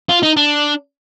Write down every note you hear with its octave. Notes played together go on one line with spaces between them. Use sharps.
F4
D#4
D4